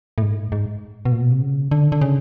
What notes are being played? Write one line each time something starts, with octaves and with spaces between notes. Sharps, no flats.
A2
G#2
G#2
B2
A#2
B2
C3
C#3
D3
D3
C#3